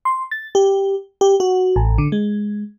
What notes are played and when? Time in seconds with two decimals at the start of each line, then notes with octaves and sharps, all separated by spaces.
0.05 C6
0.31 A6
0.55 G4
1.21 G4
1.40 F#4
1.76 A1
1.98 D3
2.12 G#3